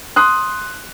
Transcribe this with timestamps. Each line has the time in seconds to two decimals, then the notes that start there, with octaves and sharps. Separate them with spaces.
0.16 C6 D#6 F#6